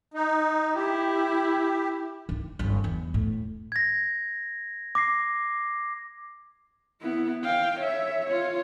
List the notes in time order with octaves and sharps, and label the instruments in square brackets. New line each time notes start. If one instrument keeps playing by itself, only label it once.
[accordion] D#4
[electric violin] E4 [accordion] G4
[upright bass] D#3 D#4
G1 F2
E2
A2
[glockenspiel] G#6 A#6
D6 A#6 C7
[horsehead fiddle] B3 E4
F5 G5
C#5 E5
F4 C#5